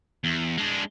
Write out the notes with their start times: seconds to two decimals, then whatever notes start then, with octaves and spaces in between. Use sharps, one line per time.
0.24 E2
0.58 G#3 D4